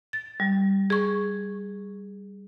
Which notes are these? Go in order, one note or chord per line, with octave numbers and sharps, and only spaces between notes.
A6
G3
G#4 C#6